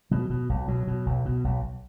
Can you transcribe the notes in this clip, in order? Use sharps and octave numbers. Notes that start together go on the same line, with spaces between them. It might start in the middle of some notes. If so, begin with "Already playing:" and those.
B2 F#3
B2
B1
B2 F#3
B2
B1
B2
B1